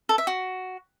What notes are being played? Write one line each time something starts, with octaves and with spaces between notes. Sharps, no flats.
A4
E5
F#4